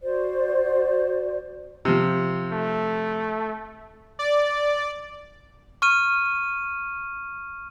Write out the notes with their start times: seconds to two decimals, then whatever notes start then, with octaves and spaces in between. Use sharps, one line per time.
0.02 F#4 C5 D5
1.85 C3 F3
2.53 A3
4.19 D5
5.82 C#6 F6 D#7